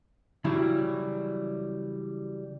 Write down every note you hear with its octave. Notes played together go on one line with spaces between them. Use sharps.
C#3 E3 F#3 G3 E4